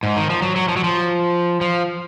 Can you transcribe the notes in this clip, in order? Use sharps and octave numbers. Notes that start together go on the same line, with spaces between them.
G#2
D#3
F3
F#3
F#3
F3
F#3
F3
F3